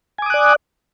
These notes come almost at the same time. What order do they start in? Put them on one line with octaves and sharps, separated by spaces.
G#5 D6 D#6 F#6 D5